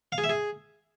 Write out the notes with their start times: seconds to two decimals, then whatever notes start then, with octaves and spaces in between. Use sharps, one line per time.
0.12 F5
0.18 G#4
0.24 E5
0.29 G#4